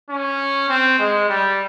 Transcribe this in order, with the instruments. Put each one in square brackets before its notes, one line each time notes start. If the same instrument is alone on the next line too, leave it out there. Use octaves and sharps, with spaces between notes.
[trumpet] C#4
C4
G#3
G3